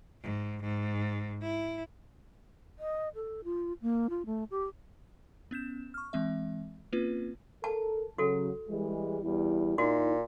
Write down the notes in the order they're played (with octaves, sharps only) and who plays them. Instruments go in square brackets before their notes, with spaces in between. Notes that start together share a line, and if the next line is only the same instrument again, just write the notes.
[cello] G#2
G#2
E4
[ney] D#5
A4
F4
A#3
F4
A3
G4
[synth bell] B3 C#4 G6 E7
C#6 F6
E3 G#3 C4 E5
A#3 C4 C#4 F4 B4
[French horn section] A4 A#4 [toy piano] A5
[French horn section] C#3 F#3 [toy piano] F#4 A4
[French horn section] E3 G3 G#3
E2 G3 E4
[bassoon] A#2 [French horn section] D#4 E4 [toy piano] F#4